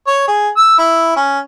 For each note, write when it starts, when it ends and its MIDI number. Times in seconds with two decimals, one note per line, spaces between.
0.07 0.23 73
0.28 0.49 68
0.57 0.78 88
0.78 1.12 64
1.16 1.39 61